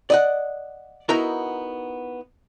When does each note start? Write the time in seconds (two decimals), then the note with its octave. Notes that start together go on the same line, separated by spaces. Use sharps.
0.10 D5 D#5 F#5
1.09 B3 D#4 E4 F#4 A#4 A#5